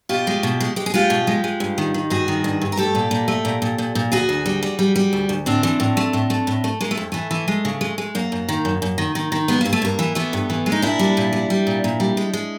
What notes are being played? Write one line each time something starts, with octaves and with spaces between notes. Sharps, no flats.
B2 F4 G4
G#3
B2
G#3
G#3 G4
G#4
G#3 F4 G4
B2
G#3
G#3
G2
D#3
D#3
G2 F#4 G#4
D#3
G2
G2
A#4
A3 G4 A4
A#2
A#2
A3
A#2
A#2
A#2
A#2
D2 F#4 G#4
D2
G3
G3
G3
G3
D2
D2
A2 C4 D4
E3
A2
A3
A2
A3
A2
A3
G#3 A#3
A3
F2
E3 A3
E3
G#3
C#3
G#3
G#3
F#2 A#3
F#2
D#3
F#2
F#2
D#3
D#3
D#3
G#3 B3
G2 A#3
A3
G2 A#3
E3
E3 A3 B3
G2
E3
G#3
D#4
A#2 D4 E4
G3
A#2
G3
G3
A#2
A#2
G3
G#3
G#3